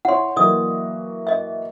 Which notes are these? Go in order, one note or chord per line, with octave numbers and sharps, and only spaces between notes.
E4 C#5 F#5 C6
E3 F#3 A#3 D5 D#5 D#6
D#5 E5